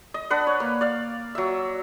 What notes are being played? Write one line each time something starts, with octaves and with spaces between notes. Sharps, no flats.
D#5
D4 B4 F#5
C#5
A#3
D5 F5
F#3 E5